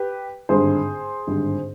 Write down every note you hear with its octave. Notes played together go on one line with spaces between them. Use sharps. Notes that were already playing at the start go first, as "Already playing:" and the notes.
Already playing: G4 B4
G#1 G2 D3 G#4 C5
G#1 G2 D3